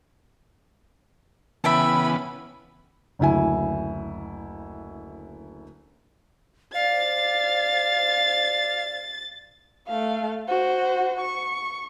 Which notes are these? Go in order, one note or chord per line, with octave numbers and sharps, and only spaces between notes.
C#3 E3 B3 E5 G5 A5 B5
F#1 D2 E4 G#5
C5 D5 F5 A6
A3 F5
F#4 C5
C#6